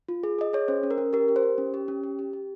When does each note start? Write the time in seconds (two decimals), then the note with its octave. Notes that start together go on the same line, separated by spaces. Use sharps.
0.09 F4
0.23 G#4
0.39 G#4 D#5
0.53 G#4 C#5
0.68 C#4 C5
0.83 C#4
0.91 A#4
0.98 C#4
1.13 G4 A#4
1.28 G4
1.36 C5
1.43 G4
1.58 C#4
1.74 G4
1.88 C#4
2.04 G4
2.19 G4
2.33 G4